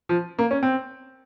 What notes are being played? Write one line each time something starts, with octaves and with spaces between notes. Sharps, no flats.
F3
A#3
C#4
C4